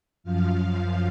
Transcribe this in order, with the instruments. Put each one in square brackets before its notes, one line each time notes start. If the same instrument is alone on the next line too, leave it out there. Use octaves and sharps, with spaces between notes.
[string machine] F#2 F3 F5
F#2 F3 F5